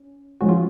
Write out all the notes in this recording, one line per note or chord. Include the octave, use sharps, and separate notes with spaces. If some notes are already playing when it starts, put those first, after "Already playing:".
Already playing: C#4
F3 G#3 C#4 F#4
F4